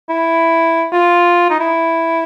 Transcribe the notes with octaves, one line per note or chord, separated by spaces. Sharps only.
E4
F4
D#4
E4